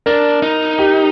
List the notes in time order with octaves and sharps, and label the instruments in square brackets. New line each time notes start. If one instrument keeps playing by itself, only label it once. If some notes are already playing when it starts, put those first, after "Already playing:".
[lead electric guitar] D4 [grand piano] A#4
[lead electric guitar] D#4
[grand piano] G4